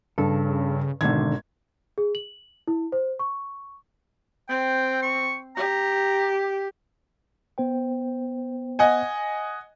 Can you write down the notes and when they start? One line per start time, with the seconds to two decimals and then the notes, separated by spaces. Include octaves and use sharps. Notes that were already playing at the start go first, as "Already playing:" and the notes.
0.18 G2 C#3 A4
1.01 G#1 B2 D3 D#3 G#6
1.98 G#4
2.15 F#7
2.68 E4
2.92 C5
3.19 C#6
4.49 C4 G5
5.02 C#6
5.56 G4 A#5
7.58 B3 C5 G5
8.79 D#5 F#5 G#5